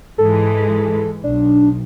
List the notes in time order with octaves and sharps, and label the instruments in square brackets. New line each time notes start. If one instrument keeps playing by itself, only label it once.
[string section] G#2 E3 G#3 [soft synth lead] A4
[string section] B1 [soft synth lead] D4